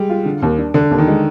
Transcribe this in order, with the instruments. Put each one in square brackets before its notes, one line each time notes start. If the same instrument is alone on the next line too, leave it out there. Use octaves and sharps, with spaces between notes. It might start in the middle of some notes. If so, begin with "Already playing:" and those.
Already playing: [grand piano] G3 G#3
[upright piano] F4
D3
D#2
D4
[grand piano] D3 [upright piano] D4
[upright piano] D#2
[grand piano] D#3
[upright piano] G#3